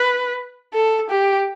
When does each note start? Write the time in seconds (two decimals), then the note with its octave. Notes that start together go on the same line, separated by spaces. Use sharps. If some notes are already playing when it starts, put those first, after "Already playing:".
Already playing: B4
0.74 A4
1.10 G4